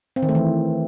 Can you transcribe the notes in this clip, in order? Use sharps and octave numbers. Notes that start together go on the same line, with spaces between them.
C4
D#3
A3
E3